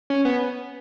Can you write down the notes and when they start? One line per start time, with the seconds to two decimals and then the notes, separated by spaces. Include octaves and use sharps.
0.10 C#4
0.25 B3